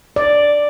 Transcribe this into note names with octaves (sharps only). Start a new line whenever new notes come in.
D5